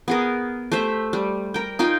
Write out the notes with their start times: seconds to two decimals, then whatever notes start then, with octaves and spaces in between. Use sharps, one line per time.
0.08 B3 G#4 A#4
0.72 A3 G4 C5 E5
1.13 G3
1.54 A#4 G5
1.79 D#4 F4 G5 G#5